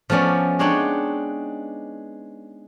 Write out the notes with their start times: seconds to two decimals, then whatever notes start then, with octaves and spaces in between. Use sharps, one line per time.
0.10 F3 A3 B3 C#4 D5
0.59 G#3 D4 D#4 C#5 F#5 G5